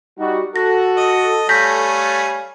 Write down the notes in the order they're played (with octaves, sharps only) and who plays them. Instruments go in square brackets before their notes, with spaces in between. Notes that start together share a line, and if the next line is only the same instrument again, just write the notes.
[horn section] G3 D#4 F#4
[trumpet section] F#4 [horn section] A4 [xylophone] A#6
[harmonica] D#5
[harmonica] G3 A3 [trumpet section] C#5 F5 G#5 [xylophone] G6 A#6 B6